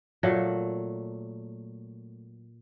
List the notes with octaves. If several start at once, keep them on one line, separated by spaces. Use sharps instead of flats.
A#2 F#3 A3